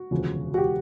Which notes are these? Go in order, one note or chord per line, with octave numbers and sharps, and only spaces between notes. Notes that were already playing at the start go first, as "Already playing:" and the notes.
Already playing: F#4
E1 D2 C#3 F3
F#4
G4